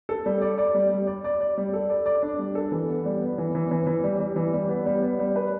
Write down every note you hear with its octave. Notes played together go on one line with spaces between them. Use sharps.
A4
G3
D5
D5
G3
G3
D5
D5
D5
G3
A4
D5
D5
D4
G3
A4
E3
B3
G3
B3
E3
E3
E3
E3
G3
G3
E3
G3
B3
G3
B3
G3
B4